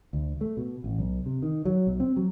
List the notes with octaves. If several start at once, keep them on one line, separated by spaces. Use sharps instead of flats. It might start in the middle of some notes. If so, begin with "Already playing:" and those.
D2
A3
B2
A1
B1
C3
D#3
F#3
B1
C4
F#3